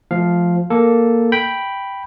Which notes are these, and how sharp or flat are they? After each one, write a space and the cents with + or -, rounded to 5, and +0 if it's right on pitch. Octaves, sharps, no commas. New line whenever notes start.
F3 +0 A3 -35 F5 +0
A#3 +0 A4 +0
G5 +0 B5 +0